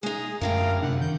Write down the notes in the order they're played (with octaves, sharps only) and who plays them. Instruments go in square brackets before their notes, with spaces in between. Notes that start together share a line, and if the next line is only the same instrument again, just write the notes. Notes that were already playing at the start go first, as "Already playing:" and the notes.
[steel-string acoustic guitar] G#3 D#4 [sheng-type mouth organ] G#4
[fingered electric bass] F#2 [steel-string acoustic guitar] A2 D3 G5 [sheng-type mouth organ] A#4 F5
[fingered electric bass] F#2 C3 D4 [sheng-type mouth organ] F#5
[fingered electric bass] D#3 [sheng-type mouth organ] G6